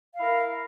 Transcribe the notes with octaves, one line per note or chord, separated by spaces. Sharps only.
E4 A#4 F5